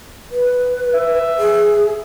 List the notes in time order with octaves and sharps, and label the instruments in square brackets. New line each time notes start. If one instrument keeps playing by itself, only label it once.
[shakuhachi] B4
[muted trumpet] E5
[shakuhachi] G#4